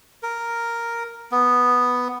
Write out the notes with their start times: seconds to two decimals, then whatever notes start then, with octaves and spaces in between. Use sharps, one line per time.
0.23 A#4
1.32 B3